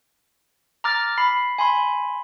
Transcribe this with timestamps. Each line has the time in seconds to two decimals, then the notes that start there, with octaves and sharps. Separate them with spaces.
0.84 A#5 D6 F6 A6
1.18 B5 C7
1.59 G#5 B5 C6